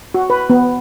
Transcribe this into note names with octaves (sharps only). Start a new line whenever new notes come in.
F#4
B4
B3